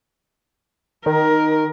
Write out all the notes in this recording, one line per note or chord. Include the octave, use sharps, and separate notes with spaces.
D#3 A#4